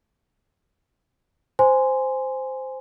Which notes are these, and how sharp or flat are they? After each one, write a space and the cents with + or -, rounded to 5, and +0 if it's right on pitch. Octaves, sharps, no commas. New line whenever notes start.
C5 -5 G#5 +0 C6 -15